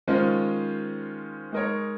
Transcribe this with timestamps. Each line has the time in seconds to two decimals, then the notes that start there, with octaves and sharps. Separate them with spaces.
0.08 D#3 G#3 C#4 F4 C5
1.52 G#3 D#4 A#4 C#5